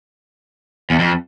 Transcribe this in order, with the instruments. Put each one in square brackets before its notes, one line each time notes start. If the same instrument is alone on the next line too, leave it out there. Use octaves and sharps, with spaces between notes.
[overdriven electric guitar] E2
F2